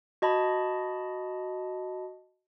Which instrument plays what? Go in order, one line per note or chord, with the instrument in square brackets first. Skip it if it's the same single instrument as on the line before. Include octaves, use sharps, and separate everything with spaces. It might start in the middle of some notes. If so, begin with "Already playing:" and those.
[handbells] F#4 D#5 A5 B5